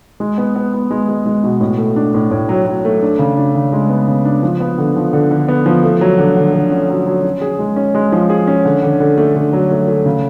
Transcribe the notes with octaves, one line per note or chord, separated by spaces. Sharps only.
G#3
B3
B3
B3
G#3
G#3
G#3
B2
A2
A3
D4
A2
A2
F#3
F#3
A3
D4
C#3
D4
C#3
G#3
B3
C#3
D4
F3
B3
D3
F3
D3
D3
B3
F3
A3
F#3
D3
D3
D3
C#4
F#3
F#3
C#4
G#4
G#3
C#4
G#3
F3
G#4
C#4
D3
D3
D3
A3
D3
F#3
A3
A3
C#3